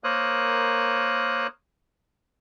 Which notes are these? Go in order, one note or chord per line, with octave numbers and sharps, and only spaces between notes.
A#3 A#4 C5 C#5 D#6 F#6